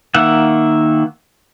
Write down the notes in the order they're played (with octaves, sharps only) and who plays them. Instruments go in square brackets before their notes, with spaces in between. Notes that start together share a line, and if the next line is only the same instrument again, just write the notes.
[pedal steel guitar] D#3 A#3 E5 F#5